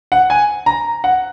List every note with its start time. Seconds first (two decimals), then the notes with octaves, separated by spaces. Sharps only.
0.12 F#5
0.30 G#5
0.66 A#5
1.04 F#5